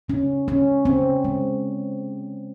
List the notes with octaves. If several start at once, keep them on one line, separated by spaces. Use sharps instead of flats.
C#3 C#4
G#3 C#4
C#3 C4
G#3